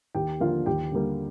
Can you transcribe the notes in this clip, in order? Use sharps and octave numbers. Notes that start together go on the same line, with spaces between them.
D#2 G4 G5
D3 F3 A#3 F4 F5
D#2 G4 G5
D3 G3 A#3